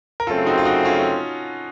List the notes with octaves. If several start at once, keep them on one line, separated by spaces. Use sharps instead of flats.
A#4
F#2 C#3 A3 C4 F4 A4
D#4 F#4
F4
D#4 F#4
C#4 F4